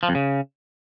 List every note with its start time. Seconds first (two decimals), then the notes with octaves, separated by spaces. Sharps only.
0.03 F3
0.09 F2
0.15 C#3